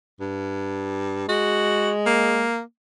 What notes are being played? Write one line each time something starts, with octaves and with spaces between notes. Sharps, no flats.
G2
G#3 F#4
A#3